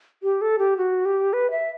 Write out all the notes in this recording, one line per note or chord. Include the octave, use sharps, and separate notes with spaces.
G4
A4
G4
F#4
G4
B4
E5